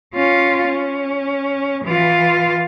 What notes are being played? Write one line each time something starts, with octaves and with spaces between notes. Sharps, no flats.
C#4 F4
C#4
E3 F4